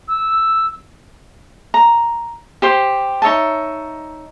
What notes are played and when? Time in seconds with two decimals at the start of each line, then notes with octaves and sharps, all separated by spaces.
0.07 E6
1.74 A#5
2.62 G4 C5 C6
3.22 D#4 C#5 E5 A5